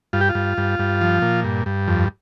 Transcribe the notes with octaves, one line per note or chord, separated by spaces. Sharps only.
G2 F4
G4
F4
G2
G2
G2
F3
A#2
G2
G2
F2